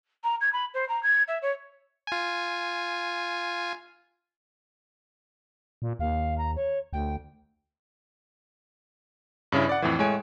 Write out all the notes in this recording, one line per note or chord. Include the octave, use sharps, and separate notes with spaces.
A#5
G#6
B5
C5
A#5
G#6
E5
C#5
F4 G#5
A#2
D#2 F5
A#5
C#5
D2 G5
G2 C#3 C#4 E4
D5 F#5
F2 A2 E3
A2 G#3 C#5 G#5 D7